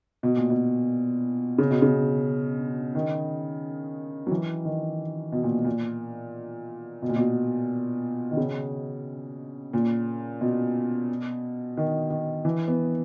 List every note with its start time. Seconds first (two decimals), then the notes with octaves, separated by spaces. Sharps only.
0.23 B2
0.37 A#2
0.50 B2
1.58 C#3
1.70 B2
1.82 C#3
2.95 D#3
4.27 F#3
4.31 E3
4.65 D#3
5.32 B2
5.43 A#2
5.65 A#2
7.02 B2
7.09 A#2
7.16 B2
8.31 D#3
8.37 C#3
9.73 A#2
10.41 B2
11.77 D#3
12.10 D#3
12.45 E3
12.68 B3